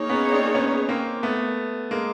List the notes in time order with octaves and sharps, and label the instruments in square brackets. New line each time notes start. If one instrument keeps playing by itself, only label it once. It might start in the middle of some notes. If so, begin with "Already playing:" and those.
Already playing: [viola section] A#3 D#4 G#4 C#5
[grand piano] B3 C#4
C4 D4
B3 C#4
A#3 C4
A3 B3
G#3 A#3